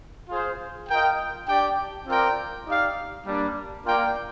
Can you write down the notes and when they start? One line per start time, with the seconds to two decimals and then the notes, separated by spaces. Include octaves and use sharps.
0.29 F4 G#4 C5 F5
0.88 F4 A#4 D#5 G5
1.48 D4 G4 D5 G5
2.07 C4 F4 A#4 D5 G5
2.67 D#4 G4 D5 F5
3.26 G3 A#3 D4
3.85 A#3 F4 A#4 D5 G5